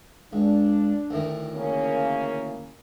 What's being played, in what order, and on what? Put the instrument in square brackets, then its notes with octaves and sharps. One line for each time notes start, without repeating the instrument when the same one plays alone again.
[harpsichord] C#2 [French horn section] D4
[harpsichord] D2 A2 D#3
[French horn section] C#3 A#3 C#4